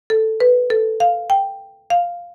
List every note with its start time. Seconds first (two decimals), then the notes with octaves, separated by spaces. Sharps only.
0.10 A4
0.40 B4
0.70 A4
1.00 F5
1.30 G5
1.90 F5